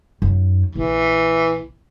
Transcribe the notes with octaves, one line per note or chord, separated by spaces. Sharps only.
F#2 D#4
A#1 E3